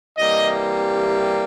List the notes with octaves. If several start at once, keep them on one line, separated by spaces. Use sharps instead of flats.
C3 E3 G3 A#3 D#5